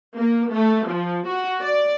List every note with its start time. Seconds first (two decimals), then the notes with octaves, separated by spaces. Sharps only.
0.18 A#3
0.52 A3
0.87 F3
1.27 F#4
1.62 D5